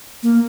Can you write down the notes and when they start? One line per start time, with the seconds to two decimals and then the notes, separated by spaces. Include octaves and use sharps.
0.23 A#3